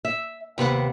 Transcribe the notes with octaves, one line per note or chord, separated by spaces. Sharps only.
E5
D#2 C3 B3 F#5